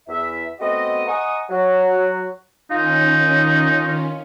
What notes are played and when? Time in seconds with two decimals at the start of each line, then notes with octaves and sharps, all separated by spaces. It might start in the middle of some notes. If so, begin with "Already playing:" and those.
0.08 E2 E5
0.60 A3 B3 C4 F#4 D#5
1.08 D#5 F#5 G#5 A#5 C#6 D#6
1.50 F#3 F#4
2.71 D#3 C#4 D#4 F4